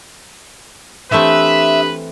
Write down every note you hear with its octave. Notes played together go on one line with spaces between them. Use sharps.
E3 A3 C4 D4 G4 B4 E5 D#6